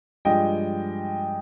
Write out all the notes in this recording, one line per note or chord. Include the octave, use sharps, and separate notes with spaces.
G2 F3 G#3 D#5 G5